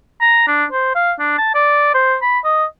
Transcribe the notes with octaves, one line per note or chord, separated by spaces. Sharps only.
A#5
D4
C5
F5
D4
A5
D5
C5
B5
D#5